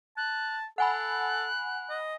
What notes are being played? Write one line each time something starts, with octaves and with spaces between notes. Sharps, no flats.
A5 F#6
A4 F#5 G#5 B5 F#6
D#5